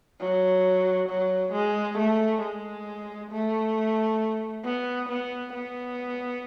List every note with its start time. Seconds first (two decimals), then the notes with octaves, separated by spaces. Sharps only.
0.20 F#3
1.09 F#3
1.53 G#3
1.98 A3
2.42 G#3
3.31 A3
4.65 B3
5.09 B3
5.53 B3